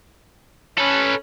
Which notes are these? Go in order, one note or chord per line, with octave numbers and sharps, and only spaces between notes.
C#4 A4 B4